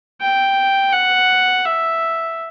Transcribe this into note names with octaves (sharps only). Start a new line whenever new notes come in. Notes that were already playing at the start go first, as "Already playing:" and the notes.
G5
F#5
E5